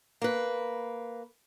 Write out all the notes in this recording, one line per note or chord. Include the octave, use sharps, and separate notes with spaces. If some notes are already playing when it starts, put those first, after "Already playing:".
A#3 B4